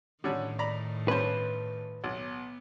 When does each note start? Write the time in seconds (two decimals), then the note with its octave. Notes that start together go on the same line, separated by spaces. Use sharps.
0.24 A2 D3 D#3 G3 C#4
0.59 D5 A#5 B5
1.08 G2 C#4 B4 C5
2.04 B1 B3